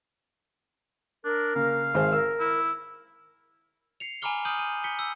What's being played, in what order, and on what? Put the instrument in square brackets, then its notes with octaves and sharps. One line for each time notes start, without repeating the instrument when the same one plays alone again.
[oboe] D4 [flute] A#4
[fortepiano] C#3 A#3 [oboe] F5
[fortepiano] G#1 G#4 C5
[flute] A#4 [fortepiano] E6
[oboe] E4
[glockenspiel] C7 C#7 F7
G#5 A#5 B5 D6 F6 G7
G#5 D#6 F6 G6 D#7 F#7
D#7
G6 B6 C#7 G7
E6